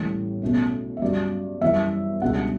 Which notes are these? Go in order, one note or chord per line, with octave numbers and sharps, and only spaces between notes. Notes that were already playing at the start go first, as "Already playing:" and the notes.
Already playing: A1 A2 E3 G3
B1 B2 A3 C#4
E5
G2 F#3 C#4 D5
F#2 E3 G3 E5
C#2 B2 G3 D4 F#5